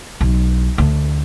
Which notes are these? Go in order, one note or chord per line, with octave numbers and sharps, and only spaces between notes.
B1
D2